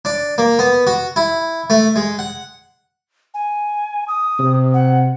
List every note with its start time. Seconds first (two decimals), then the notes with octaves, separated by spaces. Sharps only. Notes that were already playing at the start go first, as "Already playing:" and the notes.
0.05 D4
0.38 A#3
0.59 B3
0.87 F#4
1.16 E4
1.70 A3
1.96 G#3
2.19 F#5
3.34 G#5
4.08 D#6
4.39 C3
4.74 F#5